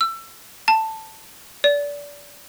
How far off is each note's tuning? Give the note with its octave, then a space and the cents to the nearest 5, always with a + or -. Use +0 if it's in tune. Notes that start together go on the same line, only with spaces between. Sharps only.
E6 +25
A5 +10
D5 -25